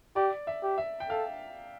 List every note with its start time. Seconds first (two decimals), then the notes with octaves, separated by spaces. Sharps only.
0.16 G4 D5
0.47 E5
0.63 G4
0.78 E5
1.00 G5
1.10 A4 F5